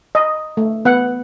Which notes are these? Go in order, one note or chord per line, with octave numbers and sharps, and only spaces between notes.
D#5
A3
B3 F#5